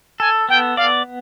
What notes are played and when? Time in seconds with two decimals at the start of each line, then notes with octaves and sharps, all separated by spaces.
0.20 A4 G#5
0.49 B3 G5
0.77 D5 F5